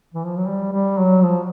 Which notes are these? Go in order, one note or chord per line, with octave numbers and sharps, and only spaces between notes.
E3
F3
F#3
G3
G3
F#3
F3